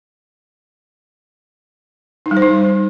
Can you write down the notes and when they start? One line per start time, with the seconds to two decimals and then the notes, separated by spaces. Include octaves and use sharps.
2.26 D#4
2.31 G3
2.37 C5
2.42 D#4